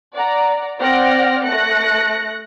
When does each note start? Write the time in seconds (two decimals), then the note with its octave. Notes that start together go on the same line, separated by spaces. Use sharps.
0.14 D5 F#5 A#5
0.79 C4 D5 F#5 G5 F6 A#6
1.45 A3 F#6 A#6 C#7